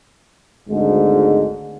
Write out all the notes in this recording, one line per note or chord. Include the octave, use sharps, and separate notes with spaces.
G#1 D2 G#2 D3 G#3